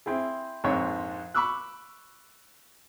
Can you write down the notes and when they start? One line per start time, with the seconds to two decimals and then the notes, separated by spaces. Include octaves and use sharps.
0.06 C4 E4 G#4
0.64 A#1 F2 G#2 C4 C#5
1.34 B5 C#6 D6 E6 F#6